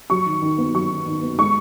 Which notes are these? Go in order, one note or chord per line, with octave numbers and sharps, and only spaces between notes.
F#3 C#6
D#3
D#3
B3
F#3 C#6
D#3
D#3
B3
G#3 C#6